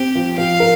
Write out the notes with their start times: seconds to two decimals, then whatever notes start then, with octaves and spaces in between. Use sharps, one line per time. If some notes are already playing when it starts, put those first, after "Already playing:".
Already playing: C4 G4
0.15 F3
0.37 F3 F5
0.60 A#4